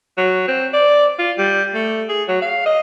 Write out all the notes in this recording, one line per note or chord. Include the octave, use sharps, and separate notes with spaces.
F#3
C4
D5
F4
G3
A3
G#4
F#3
F5
D#5